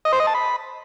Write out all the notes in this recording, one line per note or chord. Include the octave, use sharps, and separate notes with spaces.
D#5
C5
D#5
A5
B5